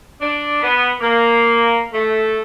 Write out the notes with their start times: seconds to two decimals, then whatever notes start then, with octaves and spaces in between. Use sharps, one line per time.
0.21 D4
0.62 B3
1.01 A#3
1.93 A3